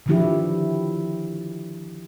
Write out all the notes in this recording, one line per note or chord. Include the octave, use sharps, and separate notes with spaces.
D3 D#3 F3 D4 E4 G4